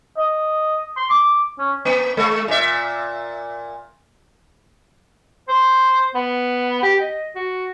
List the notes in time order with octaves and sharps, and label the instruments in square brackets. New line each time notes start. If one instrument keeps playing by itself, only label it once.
[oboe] D#5
C6
D6
C#4
[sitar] A#3
G#3
A#2 E5
[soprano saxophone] C5
B3
G4
D#5
F#4